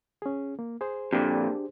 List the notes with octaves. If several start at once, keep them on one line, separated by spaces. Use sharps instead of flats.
C#4 G#4
A#3
G#4 C5
F2 A#2 D4 G4